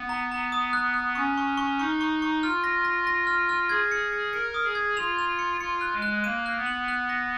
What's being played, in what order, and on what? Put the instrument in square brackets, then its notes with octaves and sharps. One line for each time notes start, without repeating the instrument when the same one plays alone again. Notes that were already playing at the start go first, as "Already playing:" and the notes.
Already playing: [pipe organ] B3
[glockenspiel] A#5
A#5
D#6
F#6
F#6
[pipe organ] C#4 [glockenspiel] C#6
[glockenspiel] C#6
C#6
[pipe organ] D#4 [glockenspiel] C#6
[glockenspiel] C#6
C#6
[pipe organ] F4 [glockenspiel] F6
[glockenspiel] A#6
A#6
A#6
F6
F6
[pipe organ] G#4 [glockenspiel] G#6
[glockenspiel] C#7
C#7
[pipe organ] A#4 [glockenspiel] C#7
[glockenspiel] D#6
[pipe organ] G#4
[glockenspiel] G#6
[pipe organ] F4 [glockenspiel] F7
[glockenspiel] F7
C#7
[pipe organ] F4 [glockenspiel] C#7
[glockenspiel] F#6
[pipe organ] G#3
[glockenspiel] F#6
[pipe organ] A#3 [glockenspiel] D#7
[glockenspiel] F#6
[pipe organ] B3
[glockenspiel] F#7
F#6
A#6